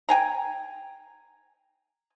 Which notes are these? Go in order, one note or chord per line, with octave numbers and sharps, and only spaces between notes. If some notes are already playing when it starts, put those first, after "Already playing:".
G5 G#5 A#5